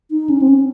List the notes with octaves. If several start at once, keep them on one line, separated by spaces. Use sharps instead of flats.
D#4
C#4
C4
C#4